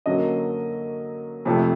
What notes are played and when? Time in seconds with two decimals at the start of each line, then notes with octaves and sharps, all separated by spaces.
0.06 F#2 D3 F#3 A#3 D#5
1.45 F2 C3 F3 A3